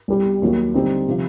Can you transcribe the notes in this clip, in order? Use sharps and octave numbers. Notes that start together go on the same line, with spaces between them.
C2 B2 G3
D#2 D#3 F#3
D3 G3 C4 D#4
C3 F3